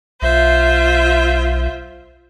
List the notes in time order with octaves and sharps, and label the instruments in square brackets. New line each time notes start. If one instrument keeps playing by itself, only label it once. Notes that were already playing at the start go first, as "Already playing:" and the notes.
[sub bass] B1 [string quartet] F4 C5 E5